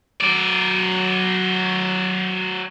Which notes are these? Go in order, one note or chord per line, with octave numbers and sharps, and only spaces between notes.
F#3 D5